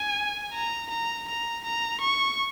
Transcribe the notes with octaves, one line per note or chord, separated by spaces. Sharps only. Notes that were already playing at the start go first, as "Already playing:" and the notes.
Already playing: G#5
A#5
A#5
A#5
A#5
C#6